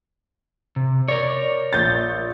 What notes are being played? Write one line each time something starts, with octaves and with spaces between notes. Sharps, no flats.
C3
A#4 C#5 D5
A#1 G6 A6